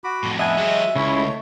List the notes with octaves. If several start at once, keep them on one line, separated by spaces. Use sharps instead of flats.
F#4 B5 D6
F2 A2
B3 D4 D#5 E5 G#5 A5
F#3 G#3 G4
C#2 C#3 E4 C#5
A3